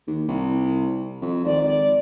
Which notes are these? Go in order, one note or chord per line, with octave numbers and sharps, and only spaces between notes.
D#2
C2
F2
G#1 D5
D5